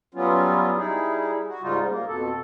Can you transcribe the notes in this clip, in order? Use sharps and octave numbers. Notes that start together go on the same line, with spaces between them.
F#3 G3 B3 C#4 F4
G3 D#4 E4 G#4
F#4
G#2 C#3 G3 D#4 F4
A#3
F2 B2 A4